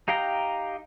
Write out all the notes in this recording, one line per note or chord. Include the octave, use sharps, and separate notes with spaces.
D#4 G4 F5 G5 A#5